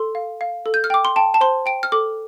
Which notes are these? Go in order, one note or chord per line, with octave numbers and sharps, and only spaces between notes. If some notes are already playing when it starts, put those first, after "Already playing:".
Already playing: A4 C6
F5
F5
A4
G6
F6
G5 D6
C6
G5 A5
A5
C5 C6
G5 D7
F6
A4 D6